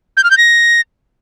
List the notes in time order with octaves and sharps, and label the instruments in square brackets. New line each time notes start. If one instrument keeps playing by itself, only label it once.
[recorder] G6
F6
G6
A#6